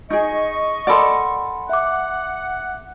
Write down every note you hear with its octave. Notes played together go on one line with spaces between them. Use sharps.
D#4 G#4 D#5 C#6
A4 A#4 D5 F#5 B5 C6
E5 F#5 D6